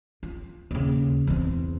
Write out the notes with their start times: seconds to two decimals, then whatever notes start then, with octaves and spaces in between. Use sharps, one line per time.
0.23 F4
0.71 D#2 C#3
1.27 E2 C4